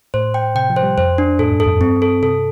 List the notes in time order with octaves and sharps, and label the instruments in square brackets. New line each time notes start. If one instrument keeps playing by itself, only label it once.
[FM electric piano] A2 [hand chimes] C5
[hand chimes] G5
[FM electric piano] C3 [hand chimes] G5
[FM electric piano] F3
[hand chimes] C5
[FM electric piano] G3
[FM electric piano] F2 [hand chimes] C5
[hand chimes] D4
[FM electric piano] A2 [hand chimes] A4
[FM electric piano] G2
[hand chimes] A4
[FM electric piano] F2
[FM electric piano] G2 [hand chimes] C4
[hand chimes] A4
[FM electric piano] C3 [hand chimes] A4